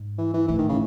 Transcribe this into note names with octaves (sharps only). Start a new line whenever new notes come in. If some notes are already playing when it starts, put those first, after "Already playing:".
Already playing: G#2
E3
E3
A2 E3
D#3
C#3